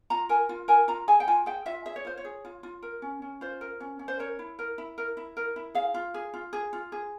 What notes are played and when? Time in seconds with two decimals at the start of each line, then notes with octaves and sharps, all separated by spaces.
0.10 F4 A#5
0.29 A#4 G#5
0.49 F4
0.68 A#4 G#5
0.88 F4 A#5
1.08 G#4 G#5
1.20 G5
1.28 F4 G#5
1.46 G#4 G5
1.66 F4 E5
1.85 G#4 E5
1.96 C#5
2.05 F4 C5
2.17 C#5
2.25 G#4
2.45 F4
2.63 F4
2.83 A#4
3.02 C#4
3.22 C#4
3.41 F4 C5
3.61 A#4
3.80 C#4
3.99 C#4
4.08 C5
4.19 A#4 C#5
4.39 E4
4.59 A#4
4.78 E4
4.98 A#4
5.17 E4
5.37 A#4
5.56 E4
5.75 G#4 F5
5.94 F4
6.14 G#4
6.34 F4
6.53 G#4
6.73 F4
6.92 G#4